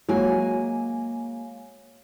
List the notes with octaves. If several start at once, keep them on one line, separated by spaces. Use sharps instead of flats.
F#3 G#3 A#3 G#5